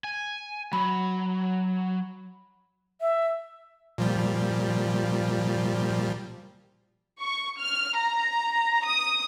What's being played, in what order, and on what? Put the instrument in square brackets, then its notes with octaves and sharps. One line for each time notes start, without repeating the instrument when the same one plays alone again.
[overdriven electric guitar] G#5
[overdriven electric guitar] F#3 [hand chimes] B5
[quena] E5
[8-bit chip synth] A#2 F3 G3
[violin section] C#6
F6
A#5
D#6